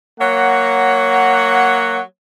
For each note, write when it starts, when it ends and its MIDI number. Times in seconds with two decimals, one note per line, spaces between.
0.20 2.00 54
0.20 2.00 58
0.20 2.00 73
0.20 2.00 78